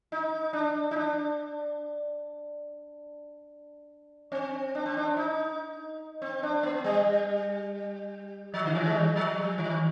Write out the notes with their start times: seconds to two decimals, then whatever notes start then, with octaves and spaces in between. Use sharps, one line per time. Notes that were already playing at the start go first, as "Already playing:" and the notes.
0.12 D#4
0.53 D4
0.91 D#4
0.96 D4
4.32 C4
4.75 D4
4.86 C4
4.97 D4
5.17 D#4
6.22 C4
6.43 D4
6.63 B3
6.84 G3
8.54 F3
8.65 D3
8.75 D#3
8.86 G#3
8.95 G3
9.16 F3
9.38 G3
9.58 D#3